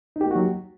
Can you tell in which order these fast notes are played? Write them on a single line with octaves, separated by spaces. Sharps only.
D#4 G4 A#3 F#4 F#3